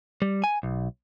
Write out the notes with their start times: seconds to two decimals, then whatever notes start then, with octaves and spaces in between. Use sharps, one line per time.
0.22 G3
0.44 G#5
0.63 B1